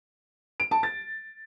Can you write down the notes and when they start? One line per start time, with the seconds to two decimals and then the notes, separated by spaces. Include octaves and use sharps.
0.60 D7
0.71 A5
0.83 A6